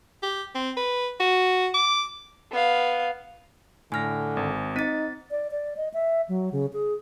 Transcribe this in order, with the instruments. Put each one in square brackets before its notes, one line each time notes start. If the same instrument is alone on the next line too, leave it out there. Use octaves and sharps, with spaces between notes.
[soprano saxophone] G4
C4
B4
F#4
D6
[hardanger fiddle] B3 F5
[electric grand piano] A2 A#6 [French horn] D3 [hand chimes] G#5 F6
[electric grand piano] G#1
[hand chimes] C4 A6 [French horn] D#4 [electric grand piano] B6 D#7
[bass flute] D5
D5
D#5
E5
F#3
C#3
G#4